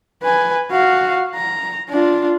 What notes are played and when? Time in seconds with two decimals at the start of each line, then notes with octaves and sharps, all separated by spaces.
0.23 B4 G#5
0.71 F#4 F5
1.35 A#5
1.89 D4 F4